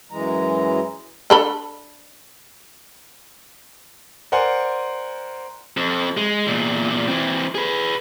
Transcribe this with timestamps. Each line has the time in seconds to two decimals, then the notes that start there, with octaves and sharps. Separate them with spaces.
0.11 F#2 E3 G#3 A#5
1.30 D4 A4 B5
4.32 A#4 C5 D5 F#5 G#5 C6
5.77 F2
6.17 G#3
6.47 E2 A#2
7.08 E3 C4
7.55 G#4 B4